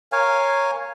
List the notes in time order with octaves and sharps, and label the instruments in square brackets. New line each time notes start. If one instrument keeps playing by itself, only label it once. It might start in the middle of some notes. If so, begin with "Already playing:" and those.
[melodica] A#4 C#5 F5 G#5